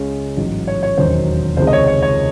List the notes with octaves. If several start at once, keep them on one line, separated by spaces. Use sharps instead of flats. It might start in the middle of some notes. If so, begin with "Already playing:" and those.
Already playing: C#2 C#3 G#3 C#4
A1 G#2 F#3
C#5
C#5
E1 D#2 D#3 F#3 C#4 C5
C#2 C3 D#3 G#3 C5
D#5
C#5
C#5
C#5